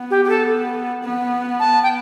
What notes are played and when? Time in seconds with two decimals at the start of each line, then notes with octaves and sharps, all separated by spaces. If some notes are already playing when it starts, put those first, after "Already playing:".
Already playing: B3
0.11 G4
0.25 G4
0.30 A4
1.04 B3
1.60 A5
1.83 G5